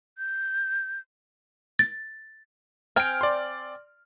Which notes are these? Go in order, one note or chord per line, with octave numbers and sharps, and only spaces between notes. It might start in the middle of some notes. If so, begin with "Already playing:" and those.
G6
A6
C4 G5 G#5 F6 D7
D5 C6